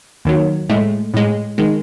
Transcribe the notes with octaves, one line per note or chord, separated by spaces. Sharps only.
D#2 D#3 F#3
A2 G#3 A3
A2 G#3
D#3 G#3